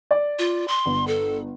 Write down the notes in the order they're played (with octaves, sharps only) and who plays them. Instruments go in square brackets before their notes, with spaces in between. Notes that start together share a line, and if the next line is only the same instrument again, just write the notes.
[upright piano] D5
[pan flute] F4
C6
[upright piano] G1
[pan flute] A4